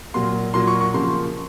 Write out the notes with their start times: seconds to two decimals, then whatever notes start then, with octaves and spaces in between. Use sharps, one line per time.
0.14 A#2 F#3 A#3 F4 C6
0.54 A#2 F#3 A#3 F4 C6
0.67 C#6
0.81 C#6
0.94 C#3 F3 A#3 C6